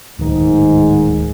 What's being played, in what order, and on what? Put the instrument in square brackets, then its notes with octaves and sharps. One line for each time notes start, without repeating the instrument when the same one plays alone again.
[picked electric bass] D1 D#3 [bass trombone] G#2